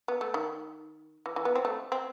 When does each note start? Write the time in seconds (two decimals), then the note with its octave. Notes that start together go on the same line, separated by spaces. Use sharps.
0.08 B3
0.21 A3
0.34 D#3
1.26 E3
1.36 E3
1.45 B3
1.55 C4
1.65 A3
1.92 C4